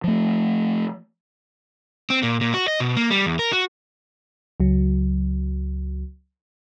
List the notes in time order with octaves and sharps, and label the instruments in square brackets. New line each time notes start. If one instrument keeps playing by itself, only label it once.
[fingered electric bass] F3 A3
[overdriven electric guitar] C4
A#2
A#2
F#4
D#5
B2
A#3
G3
E2
A#4
F#4
[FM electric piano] C#2 F#3